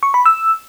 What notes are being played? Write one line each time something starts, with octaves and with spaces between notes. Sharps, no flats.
C#6
B5
E6